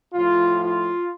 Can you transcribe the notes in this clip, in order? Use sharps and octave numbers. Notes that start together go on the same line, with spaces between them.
A2 F3 F4
F4